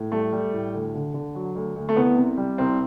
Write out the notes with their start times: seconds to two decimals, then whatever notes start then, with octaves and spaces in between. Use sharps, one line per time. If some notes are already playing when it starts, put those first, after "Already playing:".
Already playing: A2
0.12 G3 A3
0.33 G3
0.53 A2
0.74 D2
0.95 D3
1.14 D3
1.35 F#3
1.55 D2
1.76 D2
1.89 A3
1.96 C2 B3
2.17 C3
2.37 G3
2.58 C2 C4